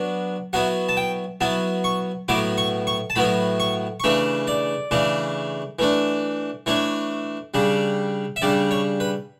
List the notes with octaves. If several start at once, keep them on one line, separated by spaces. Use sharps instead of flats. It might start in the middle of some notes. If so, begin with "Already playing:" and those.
Already playing: F#3 B3 D4
F#3 B3 E4 F#5
A5
G5
F#3 B3 E4 A5
C#6
A2 F#3 B3 E4 D6
C#6
C#6
A5
A2 F#3 B3 E4 B5
C#6
C#6
C#3 E3 A3 D4 B5
D5
C#3 E3 A3 D4
E3 A3 D4
E3 A3 D4 C#5
C#3 G3 D4
E5
C#3 G3 D4 D5
C#5
B4